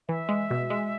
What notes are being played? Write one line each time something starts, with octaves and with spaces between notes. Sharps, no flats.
E3 E5
G#3
B2
G#3